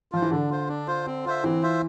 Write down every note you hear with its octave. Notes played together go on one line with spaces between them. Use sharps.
F3 F4 C5
E3
D3 D4
F4 C5
D4
F4 C5
C4
F4 C5 E5
E3 C4
F4 C5 E5